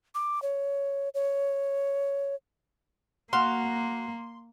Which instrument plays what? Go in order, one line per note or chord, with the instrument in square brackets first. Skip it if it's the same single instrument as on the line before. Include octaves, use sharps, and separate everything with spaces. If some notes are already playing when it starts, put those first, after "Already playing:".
[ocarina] D6
C#5
C#5
[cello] A#3 [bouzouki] F#4 F5 [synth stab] C6